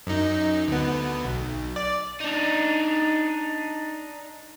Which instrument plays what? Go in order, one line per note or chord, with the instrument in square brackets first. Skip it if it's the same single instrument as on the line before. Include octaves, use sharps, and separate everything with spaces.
[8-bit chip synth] F#2 D#4
D2 B3
B1
D5
[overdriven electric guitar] D4 D#4